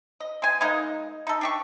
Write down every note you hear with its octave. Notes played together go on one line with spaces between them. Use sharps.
D#5
G#3 G#5
G#3 A#3 D#4 D#5
D#4 A4
D4 G4 C#6